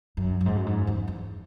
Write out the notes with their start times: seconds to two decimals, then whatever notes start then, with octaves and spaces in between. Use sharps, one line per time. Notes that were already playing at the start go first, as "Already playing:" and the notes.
0.17 F#2
0.41 F#2
0.46 G#2
0.56 F#2
0.66 G#2
0.87 E2
1.08 E2